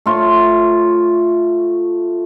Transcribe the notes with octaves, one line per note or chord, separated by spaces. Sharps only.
A3 F4 C#5